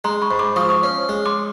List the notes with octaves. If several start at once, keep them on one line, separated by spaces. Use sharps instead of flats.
G#3 A#5 C6
B5 C#6
G#2
C6 D6
F3 C#6 D#6
C#6 D#6
C#4
G#3
C6 D6